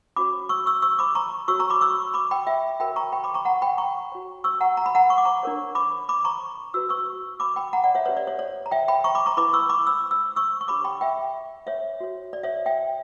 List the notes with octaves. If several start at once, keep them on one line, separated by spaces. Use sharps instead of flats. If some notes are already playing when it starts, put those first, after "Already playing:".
C#4 F#4 C#5 B5 D6
C#6 E6
C#6 E6
C#6 E6
B5 D6
A#5 C#6
F#4 C#5 C#6 E6
A#5 C#6
B5 D6
C#6 E6
B5 D6
G5 B5
E5 G5
F#4 A#4 C#5 G5 B5
A#5 C#6
G5 B5
B5 D6
A#5 C#6
F#5 A#5
G5 B5
A#5 C#6
F#4 C#5
C#6 E6
F#5 A#5
A#5
B5
F#5 A#5
C#6
D6
A#5 C#6
D4 A#4 C#5
B5 D6
B5 D6
A#5 C#6
F#4 B4 E6
C#6 E6
B5 D6
G5 B5
F#5 A#5
D5 F#5
C#5 E5
C#4 G4 B4 C#5
D5
C#5
C#5
A#5
E5 G5
G5 B5
A#5 C#6
B5 D6
A#5 C#6
E4 B4 B5 D6
C#6 E6
B5 D6
E6
E6
C#6 E6
C#6
D4 G4 C#5 B5 D6
G5 B5
E5 G5
C#5 E5
F#4 C#5
D5
C#5 E5
E5 G5